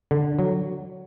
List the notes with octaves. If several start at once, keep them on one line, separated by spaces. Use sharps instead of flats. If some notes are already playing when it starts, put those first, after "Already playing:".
D3
F#3